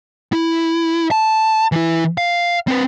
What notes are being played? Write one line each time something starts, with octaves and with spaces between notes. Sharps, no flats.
E4
A5
E3 E4
F5
C4 B4